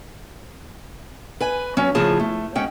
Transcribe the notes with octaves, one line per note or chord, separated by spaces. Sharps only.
B4 G#5
F#3 C#4
A2 C#3 F3 F4 G#4 A5
A3
G#2 C#4 F#5 G5